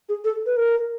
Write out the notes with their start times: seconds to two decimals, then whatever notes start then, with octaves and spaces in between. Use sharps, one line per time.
0.09 G#4
0.25 A4
0.46 B4
0.57 A#4